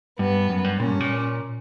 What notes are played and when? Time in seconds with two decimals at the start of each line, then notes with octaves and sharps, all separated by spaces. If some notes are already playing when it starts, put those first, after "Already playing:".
0.19 G2 B3
0.49 F#2
0.64 G2
0.79 A#2 C#4
0.90 G2
1.00 A#2